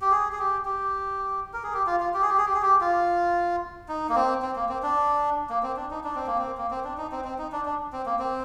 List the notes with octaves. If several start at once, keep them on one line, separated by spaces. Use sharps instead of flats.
G4
G#4
G#4
G4
G4
A#4
G#4
G4
F4
F4
G4
G#4
G4
G#4
G4
G#4
G4
F4
D#4
A#3
C4
C4
A#3
C4
D4
A#3
C4
D4
D#4
D4
C4
A#3
C4
A#3
C4
D4
D#4
C4
C4
D#4
D4
D4
C4
A#3
C4